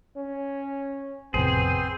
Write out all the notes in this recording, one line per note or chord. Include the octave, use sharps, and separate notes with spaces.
C#4
A1 F2 C3 B3 C4 G#4 C5